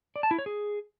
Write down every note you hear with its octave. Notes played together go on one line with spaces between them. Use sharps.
D5
A5
E4
C#5
G#4